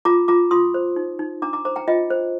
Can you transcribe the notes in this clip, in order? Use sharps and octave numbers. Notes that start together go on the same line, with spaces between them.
F4 A#5 D6
F4 A#5 D6
F4 C6 D#6
C5
D#4
D#4
D4 A#5 D6
A#5 D6
C5 A#5 D6
G5 A#5
F4 D#5 G5
C5